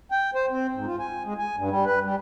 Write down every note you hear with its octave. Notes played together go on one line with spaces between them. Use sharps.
G5
C5
C4
G#2
F4
G#5
G#3
G#5
G2
G3
B4
G3